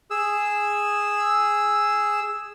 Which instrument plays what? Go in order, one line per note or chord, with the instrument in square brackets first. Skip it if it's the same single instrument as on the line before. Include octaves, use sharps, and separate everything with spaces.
[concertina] G#4 E6